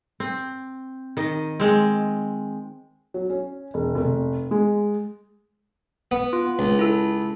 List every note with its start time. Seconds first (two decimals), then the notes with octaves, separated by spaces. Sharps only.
0.20 C4
1.17 D#3 D#5
1.60 G#3 C4
3.14 F#3
3.30 C#4
3.74 E1
3.95 F1
4.51 G#3
6.11 B3
6.33 F4
6.59 C#2
6.79 E4 A4